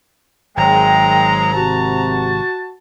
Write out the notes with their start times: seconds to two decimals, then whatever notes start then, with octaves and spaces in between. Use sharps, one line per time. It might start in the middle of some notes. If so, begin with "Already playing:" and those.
0.57 G#1 G#2 F#3 G#3 G5 A#5
1.53 C3 F#4 A5